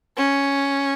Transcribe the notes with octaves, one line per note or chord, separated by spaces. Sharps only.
C#4